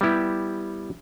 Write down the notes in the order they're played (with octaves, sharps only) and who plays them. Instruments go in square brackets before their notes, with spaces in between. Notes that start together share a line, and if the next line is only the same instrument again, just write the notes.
[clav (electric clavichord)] G3 B3 E4 G4